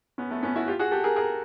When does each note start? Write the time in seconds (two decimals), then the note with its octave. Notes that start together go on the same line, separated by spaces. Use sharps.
0.18 B3 C#4
0.31 A3 B3
0.43 B3 C#4
0.56 E4 F#4
0.67 F4 G4
0.79 F#4 G#4
0.91 G4 A4
1.04 G#4 A#4
1.16 G#4 A#4